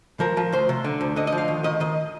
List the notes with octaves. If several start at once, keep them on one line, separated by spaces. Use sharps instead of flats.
F3 A#4
F3
D2 C5
C3
D3
D2
D3 D#5
D#5
F3
F5
D#3
D#3 D#5
D#3 D#5